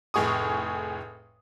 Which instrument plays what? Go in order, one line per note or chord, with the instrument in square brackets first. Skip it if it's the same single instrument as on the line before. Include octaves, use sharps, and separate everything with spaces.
[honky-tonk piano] F1 A2 G#4 C#6 D#6